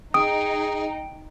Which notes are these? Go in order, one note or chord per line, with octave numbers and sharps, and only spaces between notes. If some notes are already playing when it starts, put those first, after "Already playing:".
D#4 G#4 G5 D#6 D7